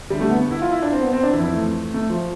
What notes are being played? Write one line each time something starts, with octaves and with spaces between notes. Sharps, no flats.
D2 D3 G3
A3
B3
E4
F4
E4
D4
C4
B3
C4
D4
F2 E3 E4
E4
A3
A3
F3